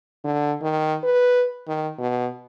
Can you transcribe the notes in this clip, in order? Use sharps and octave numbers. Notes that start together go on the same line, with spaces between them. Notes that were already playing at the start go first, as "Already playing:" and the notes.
D3
D#3
B4
D#3
B2